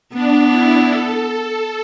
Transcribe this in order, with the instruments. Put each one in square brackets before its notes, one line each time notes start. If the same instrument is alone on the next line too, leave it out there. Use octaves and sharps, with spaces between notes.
[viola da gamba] B3 [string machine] D4
[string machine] E4
A4
A4